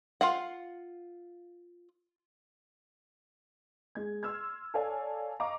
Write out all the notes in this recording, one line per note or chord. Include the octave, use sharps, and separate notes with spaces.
F4 F5 F#5
G#3 G#6
C6 E6 F6 G#6
A4 C#5 D5 F5 G#5
D#5 F5 A#5 C#6 D6